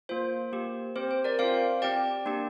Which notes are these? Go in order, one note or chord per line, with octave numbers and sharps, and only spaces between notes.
A#3 F4 C5
A#3 G4
C4 G4 C5
C5
A#4 D5
C4 F4 C5 F5
C4 G4 D5 G5
A#3 D4 G4